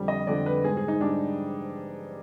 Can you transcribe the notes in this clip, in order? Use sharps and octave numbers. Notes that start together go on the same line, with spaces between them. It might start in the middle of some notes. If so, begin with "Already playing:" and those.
Already playing: F2 D3 G3
D#5
F2 D3 G3 D5
B4
G#2 G3 G#4
G#4
D#4
G#2 G3 D4